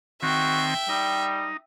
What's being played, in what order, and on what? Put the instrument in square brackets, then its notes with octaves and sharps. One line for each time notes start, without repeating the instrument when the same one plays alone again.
[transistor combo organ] D#3 C4 [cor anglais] F#4 [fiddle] E5 G5
[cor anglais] G3 [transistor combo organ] D#4